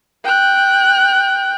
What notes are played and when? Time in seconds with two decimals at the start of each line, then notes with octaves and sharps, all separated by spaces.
0.24 G5 F#6